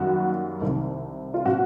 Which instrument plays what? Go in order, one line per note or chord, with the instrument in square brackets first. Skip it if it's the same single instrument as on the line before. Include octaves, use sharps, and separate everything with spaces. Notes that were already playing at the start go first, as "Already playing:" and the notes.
Already playing: [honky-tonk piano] F#2 D#3 G3 A#3 F#4
C2 C3 D#3
F4
B2 F#3 F#4